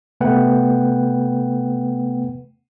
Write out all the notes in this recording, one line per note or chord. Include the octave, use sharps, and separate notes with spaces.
C3 A3 B3 B4 F#5 G5